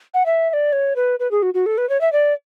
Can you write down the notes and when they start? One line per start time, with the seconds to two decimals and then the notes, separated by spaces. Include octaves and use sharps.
0.14 F#5
0.26 E5
0.50 E5
0.53 D5
0.72 C#5
0.96 B4
1.20 B4
1.31 G#4
1.42 F#4
1.54 F#4
1.66 A4
1.78 B4
1.89 C#5
2.01 E5
2.12 D5